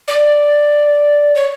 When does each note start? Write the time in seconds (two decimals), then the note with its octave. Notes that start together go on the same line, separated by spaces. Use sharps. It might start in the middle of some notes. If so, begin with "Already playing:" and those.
0.08 D5
1.35 C#5